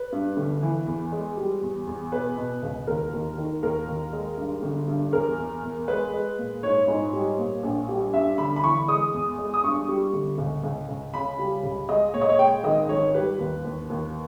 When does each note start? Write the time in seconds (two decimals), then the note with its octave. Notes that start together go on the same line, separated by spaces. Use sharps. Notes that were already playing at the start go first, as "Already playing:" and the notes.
Already playing: B4
0.12 G2
0.37 G1
0.63 E3
0.87 E2
1.12 G#3
1.37 G3
1.62 E2
1.87 E2
2.12 B2 B4
2.37 B2
2.63 C#2
2.87 D#2 A#4
3.13 D#2
3.38 D#3
3.63 D#2 A#4
3.88 D#2
4.13 G#3
4.38 G2
4.63 G1
4.88 G2
5.13 E2 A#4
5.38 E2
5.63 E2
5.88 G#3 B4
6.13 G#3
6.38 A#2
6.63 G#2 C#5
6.88 G#2
7.13 G3
7.39 A#2
7.63 A#1
7.88 G3
8.13 G2 E5
8.38 G1 B5
8.56 B5
8.63 E3 C#6
8.88 G#3 D#6
9.14 E2
9.38 G#3
9.54 D#6
9.64 G2 C#6
9.89 G3
10.13 G1
10.38 C#2
10.64 C#2
10.89 C#2
11.14 C#3 B5
11.39 G3
11.63 C#2
11.89 G#3 D#5
12.14 A#2 C#5
12.21 D#5
12.29 C#5
12.39 G#3 G5
12.64 G#1 D#5
12.89 G#1 C#5
13.14 G3 B4
13.39 D#2
13.64 D#2
13.90 D#2